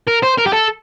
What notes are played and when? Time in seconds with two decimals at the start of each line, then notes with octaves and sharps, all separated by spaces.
0.07 A#4
0.22 C5
0.38 A#4
0.46 G4
0.53 A4